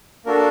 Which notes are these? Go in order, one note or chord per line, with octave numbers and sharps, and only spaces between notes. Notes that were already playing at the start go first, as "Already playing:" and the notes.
A#3 D4 F#4 A4 A#4